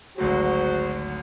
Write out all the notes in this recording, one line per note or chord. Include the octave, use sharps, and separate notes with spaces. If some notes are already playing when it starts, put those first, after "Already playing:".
G#1 D2 F#3 F#4 G#4 C5